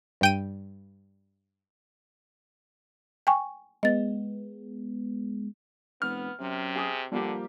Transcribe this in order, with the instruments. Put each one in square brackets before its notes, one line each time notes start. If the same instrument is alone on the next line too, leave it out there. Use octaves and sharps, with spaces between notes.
[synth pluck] G2 G5 D#7
[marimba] G5 G#5 C#6
[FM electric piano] G#3 B3 [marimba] D#5 A6
[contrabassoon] F1 [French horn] B3 [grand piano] F6
[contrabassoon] F#2 [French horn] C3
[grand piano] G#4 D#6
[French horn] D3 [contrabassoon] F3 [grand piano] G3 A#3 G4